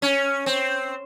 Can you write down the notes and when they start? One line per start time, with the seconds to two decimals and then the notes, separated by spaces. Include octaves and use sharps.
0.02 C#4
0.46 C4